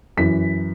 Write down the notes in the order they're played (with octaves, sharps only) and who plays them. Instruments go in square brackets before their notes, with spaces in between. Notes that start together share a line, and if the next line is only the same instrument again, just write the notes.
[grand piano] F#2 E3 B6